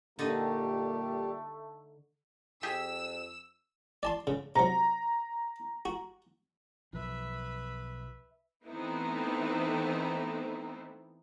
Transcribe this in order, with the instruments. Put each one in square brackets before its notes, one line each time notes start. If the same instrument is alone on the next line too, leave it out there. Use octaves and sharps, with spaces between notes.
[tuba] A#2 [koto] D3 D#4 [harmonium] G3 G4 [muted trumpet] A3
[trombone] F2 [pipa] G4 G#4 [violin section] E6
[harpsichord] D5 A5 C6
C#3
[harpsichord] C3 F#3 [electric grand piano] A#5
[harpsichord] F#4
[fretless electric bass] B1 F3 [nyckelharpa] B4 E5
[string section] E3 A3 B3 C4 D#4 E4